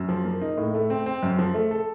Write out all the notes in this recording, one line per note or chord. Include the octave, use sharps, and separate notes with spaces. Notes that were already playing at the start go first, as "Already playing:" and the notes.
Already playing: F#2
F3
A#3
D#4
A2
A3
C4
C4
F#2
F3
A3
A4